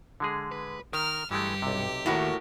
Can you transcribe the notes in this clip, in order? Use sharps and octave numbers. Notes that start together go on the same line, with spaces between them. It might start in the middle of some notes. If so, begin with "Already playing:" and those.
D3 G#3 G#4
B4
D#3 A#4 F6
G2 E3 G#3 A3 G4
B1 C3
D#2 A2 F#4 A#4